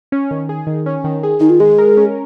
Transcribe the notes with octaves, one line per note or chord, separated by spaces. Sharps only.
C#4
D#3
G#4
D#3
C#4
D#3
G#4
D#3 D#4
F4
G#3 G#4
A#4
C#4